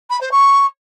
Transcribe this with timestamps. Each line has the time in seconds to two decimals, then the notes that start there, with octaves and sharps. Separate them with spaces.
0.10 B5
0.21 C5
0.31 C#6